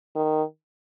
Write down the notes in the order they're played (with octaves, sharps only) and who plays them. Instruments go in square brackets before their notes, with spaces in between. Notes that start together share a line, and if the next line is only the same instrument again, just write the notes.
[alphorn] D#3